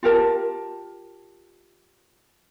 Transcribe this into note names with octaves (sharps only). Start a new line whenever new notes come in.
F4 G4 A#4 A5